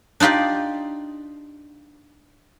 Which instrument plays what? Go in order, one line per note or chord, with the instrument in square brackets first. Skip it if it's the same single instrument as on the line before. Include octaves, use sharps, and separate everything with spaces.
[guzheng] D4 D#4 F4 G4 D5